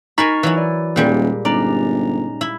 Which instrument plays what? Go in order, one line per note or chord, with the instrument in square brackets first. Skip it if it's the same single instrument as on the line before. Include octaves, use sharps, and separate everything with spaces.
[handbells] D#4 A#5 C#6 [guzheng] A#4 G#5 B5
[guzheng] E3 F#3 E4
[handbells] D5
[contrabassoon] D#1 [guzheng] A#2 G3 G#3
[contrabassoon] G1 [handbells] C#4 D#4 A#5 [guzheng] D5
[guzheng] E4